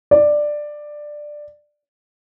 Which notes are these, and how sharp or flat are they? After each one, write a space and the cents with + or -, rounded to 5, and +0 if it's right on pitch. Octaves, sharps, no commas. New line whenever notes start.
D5 +10